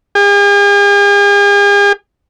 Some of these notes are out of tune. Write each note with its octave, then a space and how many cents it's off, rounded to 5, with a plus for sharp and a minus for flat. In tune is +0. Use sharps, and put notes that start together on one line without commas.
G#4 -45